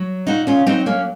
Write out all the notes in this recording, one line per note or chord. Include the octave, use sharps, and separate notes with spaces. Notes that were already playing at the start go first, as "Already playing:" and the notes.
Already playing: F#3
A#2 D#4 F#4
C#4 F4
F#3 C4 D#4
A#3 C#4